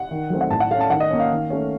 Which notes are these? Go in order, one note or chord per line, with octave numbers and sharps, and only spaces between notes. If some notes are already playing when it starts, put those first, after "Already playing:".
Already playing: F#5
D#3
F#3 A3 C4
F#5
A2 A5
F#5
A3 C#4 F5
A5
D#3 F#5
D#5
A#3 C#4
F5
D#3
A3 C#4